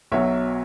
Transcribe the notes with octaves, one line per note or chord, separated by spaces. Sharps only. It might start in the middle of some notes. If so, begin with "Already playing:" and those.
B1 B2 F#3 C#5 E5